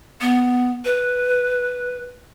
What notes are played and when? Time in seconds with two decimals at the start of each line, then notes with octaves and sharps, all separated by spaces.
0.21 B3
0.85 B4